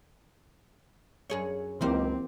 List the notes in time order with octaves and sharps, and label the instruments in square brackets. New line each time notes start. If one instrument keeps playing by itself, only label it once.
[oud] F#2 G#4 C#5
[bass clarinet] C#2 [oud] F#2 D#4 C5 [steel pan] E3 A#3 G4 [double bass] C4